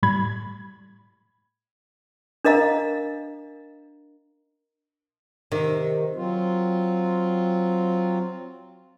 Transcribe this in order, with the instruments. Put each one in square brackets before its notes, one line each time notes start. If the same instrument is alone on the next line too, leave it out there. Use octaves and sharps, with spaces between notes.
[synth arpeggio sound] A2 G3 B5 G#6
[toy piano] D4 A#4 D#5 F5 A#5
[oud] C3 [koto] D#3
[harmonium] F#3 C4 F4